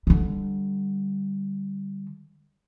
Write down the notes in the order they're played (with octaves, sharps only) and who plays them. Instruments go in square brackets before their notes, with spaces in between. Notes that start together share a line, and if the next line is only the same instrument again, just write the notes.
[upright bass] D3 G3